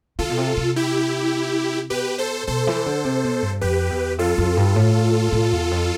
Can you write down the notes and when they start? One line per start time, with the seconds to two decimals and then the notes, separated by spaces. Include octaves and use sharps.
0.19 D3 F4 A4
0.29 B2
0.38 C3
0.57 C3
0.76 E4 G4
1.90 B2 G4 B4
2.18 A4 C5
2.47 B2 A4 C5
2.67 E3
2.86 D3
3.04 C3
3.24 B2
3.42 G2
3.61 F2 G4 B4
3.90 E2
4.18 F2 F4 A4
4.38 F2
4.57 G2
4.76 A2
5.32 A2
5.52 E2
5.71 F2